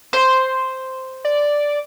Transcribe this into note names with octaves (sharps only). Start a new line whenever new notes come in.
C5
D5